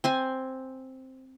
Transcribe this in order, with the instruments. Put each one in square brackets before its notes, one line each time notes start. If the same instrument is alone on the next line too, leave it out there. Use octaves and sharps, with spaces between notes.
[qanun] C4 C5 G#5